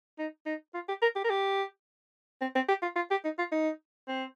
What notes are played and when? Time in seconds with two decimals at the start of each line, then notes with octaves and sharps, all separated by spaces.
0.18 D#4
0.46 D#4
0.74 F4
0.88 G4
1.02 A#4
1.16 G4
1.24 A#4
1.30 G4
2.41 C4
2.55 C4
2.68 G4
2.82 F4
2.96 F4
3.11 G4
3.24 D#4
3.38 F4
3.52 D#4
4.07 C4